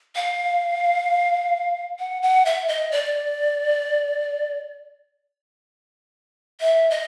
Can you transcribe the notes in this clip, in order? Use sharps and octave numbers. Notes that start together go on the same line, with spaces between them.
F5
F#5
F#5
E5
D#5
D5
E5
D#5